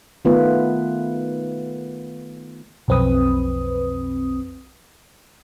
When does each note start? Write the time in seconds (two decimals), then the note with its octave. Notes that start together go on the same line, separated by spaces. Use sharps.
0.25 D#3 A3 B3 F4 B4
2.88 B1 F2 C4 B4 D#6